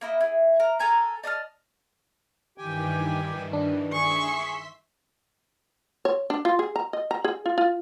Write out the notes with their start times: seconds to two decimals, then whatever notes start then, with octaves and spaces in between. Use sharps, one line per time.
0.01 A#3 E4 D#5
0.21 E4 G#4
0.60 A#4
0.80 A4 A#4 G#5 A#5
1.23 D5 D#5 A5 F6
2.58 G2 D#3 E3 G4 G5 G#5
3.53 D4
3.93 G#4 E5 C6 C#6 B6
6.05 C#5
6.30 D4
6.45 F4
6.59 G#4
6.76 A#5
6.93 D#5
7.11 A#5
7.24 G#4
7.46 F4
7.58 F4